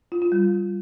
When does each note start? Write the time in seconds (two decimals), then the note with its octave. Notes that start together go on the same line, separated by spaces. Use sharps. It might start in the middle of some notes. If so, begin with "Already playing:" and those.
0.12 F4
0.22 F4
0.32 G3